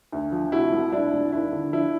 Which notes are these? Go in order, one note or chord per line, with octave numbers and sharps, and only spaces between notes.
D2
F3
C3 E4 F#4
C2
C2 D4 E4
C2
D#2 D4 E4
D3
F3 D4 E4